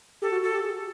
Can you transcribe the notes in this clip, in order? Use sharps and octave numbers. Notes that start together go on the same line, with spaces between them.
G4 A4
F#4
F#4 A4
G4
G#4